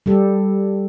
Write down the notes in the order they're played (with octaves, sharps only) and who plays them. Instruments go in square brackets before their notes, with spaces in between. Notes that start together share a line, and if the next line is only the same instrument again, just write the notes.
[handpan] G3 G4 A4